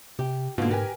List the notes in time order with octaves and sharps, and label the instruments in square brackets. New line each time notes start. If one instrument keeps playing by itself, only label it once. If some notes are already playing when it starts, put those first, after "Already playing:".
[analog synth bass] C3 [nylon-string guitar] G4
[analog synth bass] G#2 [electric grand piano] B2 D3 [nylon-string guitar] A#3 F4
[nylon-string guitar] G4 [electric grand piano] A#4 B4 G#5